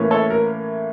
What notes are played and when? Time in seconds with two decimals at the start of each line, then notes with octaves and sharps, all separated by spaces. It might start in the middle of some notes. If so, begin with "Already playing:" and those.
Already playing: A2 E3 A#3 C#4
0.11 A4 C#5
0.30 A#4